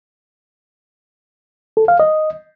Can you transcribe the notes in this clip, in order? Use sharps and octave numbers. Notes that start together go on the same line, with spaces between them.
A4
F5
D#5